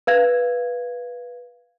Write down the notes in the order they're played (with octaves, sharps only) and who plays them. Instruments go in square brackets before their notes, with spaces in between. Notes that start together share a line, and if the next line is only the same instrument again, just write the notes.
[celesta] B4 F5 G#6